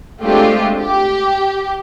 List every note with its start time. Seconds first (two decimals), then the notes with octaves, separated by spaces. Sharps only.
0.21 G#3 A3 C4 D4 F4 G4
0.79 G4